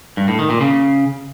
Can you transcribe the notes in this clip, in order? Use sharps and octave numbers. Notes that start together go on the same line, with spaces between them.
G2
A2
D#3
A#2
C#3